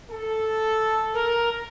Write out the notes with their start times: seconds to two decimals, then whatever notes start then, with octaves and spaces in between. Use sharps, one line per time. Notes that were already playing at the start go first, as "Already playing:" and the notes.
0.11 A4
1.14 A#4